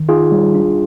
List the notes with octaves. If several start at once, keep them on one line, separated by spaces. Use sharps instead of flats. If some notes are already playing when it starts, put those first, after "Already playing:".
Already playing: D#3
D#4 F4 G#4
G3
D4